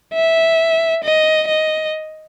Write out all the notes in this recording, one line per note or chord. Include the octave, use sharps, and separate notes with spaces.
E5
D#5
D#5